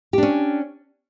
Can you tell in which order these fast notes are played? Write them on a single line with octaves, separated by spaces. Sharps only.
G4 D4 C#4